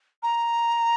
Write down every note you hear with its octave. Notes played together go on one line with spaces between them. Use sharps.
A#5